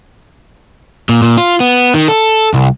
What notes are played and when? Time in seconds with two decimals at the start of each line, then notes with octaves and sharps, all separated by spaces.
1.09 A#2
1.22 A#2
1.38 F4
1.60 B3
1.94 D#3
2.08 A4
2.54 C2